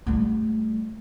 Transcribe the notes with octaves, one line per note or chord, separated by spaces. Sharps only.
G3 A3